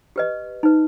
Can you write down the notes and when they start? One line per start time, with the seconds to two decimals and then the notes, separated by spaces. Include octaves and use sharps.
0.16 G4 B4 D#5
0.63 D#4 B4